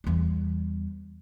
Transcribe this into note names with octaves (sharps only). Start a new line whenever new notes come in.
E2 G3